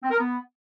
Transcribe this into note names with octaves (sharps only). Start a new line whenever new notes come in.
C4
A#4
B3